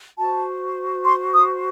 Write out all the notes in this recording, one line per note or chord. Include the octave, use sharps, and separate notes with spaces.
F#4 C5 A5
C6
D#6